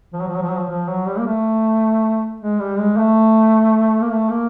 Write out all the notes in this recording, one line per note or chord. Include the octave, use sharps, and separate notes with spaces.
F3
F#3
F3
F#3
F3
F#3
F3
F3
F#3
G3
A#3
A3
G#3
G3
G#3
A3
A#3
A3
A#3